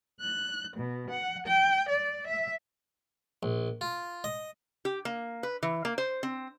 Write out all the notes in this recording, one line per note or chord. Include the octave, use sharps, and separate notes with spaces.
F#6
B2
F#5
G5
D5
E5
A#1
F4
D#5
G4
A#3
B4
E3
A#3
C5
C4